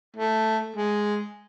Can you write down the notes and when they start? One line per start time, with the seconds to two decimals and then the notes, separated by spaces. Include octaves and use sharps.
0.16 A3
0.76 G#3